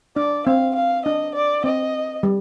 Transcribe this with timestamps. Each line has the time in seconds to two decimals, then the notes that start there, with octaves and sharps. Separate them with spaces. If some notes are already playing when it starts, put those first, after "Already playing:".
0.16 D4 D5
0.47 C4 F5
0.75 F5
1.06 D4 D#5
1.35 D5
1.64 C4 D#5
2.23 G3